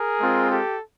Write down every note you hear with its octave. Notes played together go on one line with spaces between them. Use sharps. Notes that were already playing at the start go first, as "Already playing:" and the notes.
Already playing: G#4 A#4
G#3 C4 F4
G4 A4